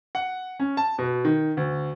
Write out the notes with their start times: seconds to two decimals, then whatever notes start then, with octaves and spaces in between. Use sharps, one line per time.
0.15 F#5
0.60 C#4
0.77 A5
0.98 B2
1.25 D#3
1.57 D2